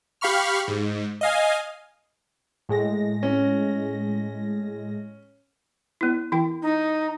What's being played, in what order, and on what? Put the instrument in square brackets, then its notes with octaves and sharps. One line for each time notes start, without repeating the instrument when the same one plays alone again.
[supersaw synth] G4 F5 B5 C#6 F6
G#2
D#5 F5 G#5
[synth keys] A2 G#3 A#6
[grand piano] C#4
[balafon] B3 E4
E3 E4 G5
[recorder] D#4